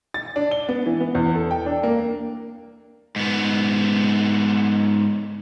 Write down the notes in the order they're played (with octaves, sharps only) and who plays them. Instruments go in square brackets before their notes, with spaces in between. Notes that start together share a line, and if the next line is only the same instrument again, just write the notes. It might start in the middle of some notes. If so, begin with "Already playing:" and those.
[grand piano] A6
D4
G7
B3
E3
B3
E2
A4
G5
D4
A#3
[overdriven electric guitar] G#2 B3